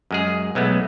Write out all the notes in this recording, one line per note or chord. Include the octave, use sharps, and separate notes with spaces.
F#2 G#3 G#4
B1 G#3 A3 B3